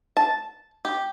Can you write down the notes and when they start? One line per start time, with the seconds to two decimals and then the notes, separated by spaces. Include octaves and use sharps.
0.17 A5
0.85 G4